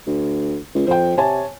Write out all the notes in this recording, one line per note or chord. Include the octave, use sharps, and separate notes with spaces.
D2
C#2
F2 C5 G5
C3 C#5 G#5 A5